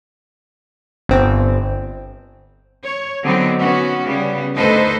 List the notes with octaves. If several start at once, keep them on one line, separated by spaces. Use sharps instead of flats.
G1 C4
C#5
D3 F#3 B3 C4 D#4
B3 C#4 F#4
C#3 G3 B3
D2 D#4 A4 B4 C5 D#5